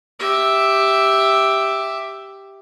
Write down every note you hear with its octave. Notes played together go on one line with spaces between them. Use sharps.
G4 E5